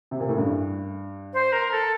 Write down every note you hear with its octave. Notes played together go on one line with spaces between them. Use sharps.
C3
A#2
A2
G2
C5
A#4
A4